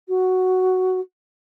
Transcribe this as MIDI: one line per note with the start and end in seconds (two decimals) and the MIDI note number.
0.08 1.00 66